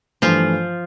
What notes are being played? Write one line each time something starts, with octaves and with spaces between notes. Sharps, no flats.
G2 E3 F3 A3 F4